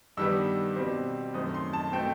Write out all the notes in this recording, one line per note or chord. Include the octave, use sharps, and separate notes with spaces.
G2 D#3 G3 B3 E6
B2 G3 C4
F#2 D#3 A3 C4 D#6
C6
A5
B2 A3 C4 G5